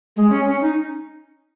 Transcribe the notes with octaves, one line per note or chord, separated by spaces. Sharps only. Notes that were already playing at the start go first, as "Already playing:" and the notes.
G#3
C#4
C#4
D#4